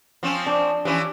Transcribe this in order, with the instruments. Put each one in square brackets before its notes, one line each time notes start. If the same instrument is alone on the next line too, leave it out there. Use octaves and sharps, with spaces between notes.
[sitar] F3 C4 C#4
[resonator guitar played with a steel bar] D4
[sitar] E3 F3 C#4 [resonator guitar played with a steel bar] G4